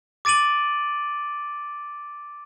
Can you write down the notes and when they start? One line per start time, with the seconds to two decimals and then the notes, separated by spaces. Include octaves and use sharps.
0.25 D6 A6 D7 D#7 F#7